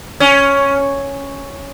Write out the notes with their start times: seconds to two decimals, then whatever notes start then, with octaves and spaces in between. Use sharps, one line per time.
0.20 C#4